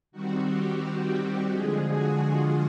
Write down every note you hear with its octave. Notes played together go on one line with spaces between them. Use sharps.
D#3 G3 C4 F#4
G4
D3 F3 G#3 G#4
F#4
F4